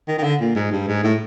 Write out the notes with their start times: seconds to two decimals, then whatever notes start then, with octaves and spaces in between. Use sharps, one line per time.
0.08 D#3
0.18 D#3
0.24 D3
0.41 A#2
0.56 G#2
0.72 G2
0.88 G#2
1.04 A2